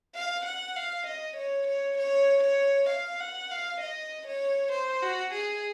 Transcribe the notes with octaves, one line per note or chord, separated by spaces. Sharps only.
F5
F#5
F5
D#5
C#5
C#5
C#5
C#5
F5
F#5
F5
D#5
C#5
C5
F#4
G#4